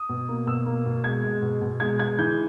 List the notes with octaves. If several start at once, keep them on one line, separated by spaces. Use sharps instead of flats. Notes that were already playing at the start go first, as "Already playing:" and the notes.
Already playing: D#6
B2
A#3
B2 E6
A#3
B2
G#3 G#6
G#3
B2
B2
G#3 G#6
G#3 G#6
E3 G6